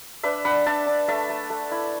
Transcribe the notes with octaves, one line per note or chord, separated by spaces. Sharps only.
D4 B4 E5
D4 F#5 B5
D4 E5 A5
D4
A3 E5 A5
A3
A3
E4